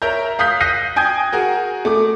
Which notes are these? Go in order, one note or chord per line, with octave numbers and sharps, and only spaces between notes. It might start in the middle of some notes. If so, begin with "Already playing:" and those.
A#4 C#5 E5 A#5 G6
F5 D#6 F#6 G6 B6
F#6 G6 A#6 C7 D#7
G5 G#5 D#6 G6 G#6
F#4 G#4 A#4
A3 D6